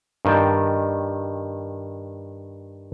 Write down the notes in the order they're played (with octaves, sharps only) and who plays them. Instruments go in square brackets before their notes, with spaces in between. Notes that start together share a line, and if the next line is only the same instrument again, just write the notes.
[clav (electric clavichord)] G2 D#3 G5 A5